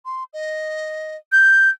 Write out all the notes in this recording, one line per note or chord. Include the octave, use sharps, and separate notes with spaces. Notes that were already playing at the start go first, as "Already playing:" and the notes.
C6
D#5
G6